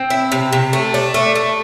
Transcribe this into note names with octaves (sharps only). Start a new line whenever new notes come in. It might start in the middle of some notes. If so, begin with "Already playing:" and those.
Already playing: C4
E4
C3
C3
A3
D4
A3
A3